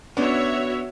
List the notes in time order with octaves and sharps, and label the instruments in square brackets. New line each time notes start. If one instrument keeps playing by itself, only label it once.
[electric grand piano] B3 [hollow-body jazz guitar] C#4 D4 [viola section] F#4 C#5 E5